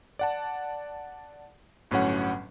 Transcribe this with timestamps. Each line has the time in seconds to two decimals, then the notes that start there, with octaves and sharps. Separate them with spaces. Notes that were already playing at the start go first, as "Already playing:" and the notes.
0.19 D5 F#5 A5
1.91 G1 A2 F#3 C#4 F#5